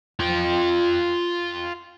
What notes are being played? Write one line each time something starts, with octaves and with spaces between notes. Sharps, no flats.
F4 G5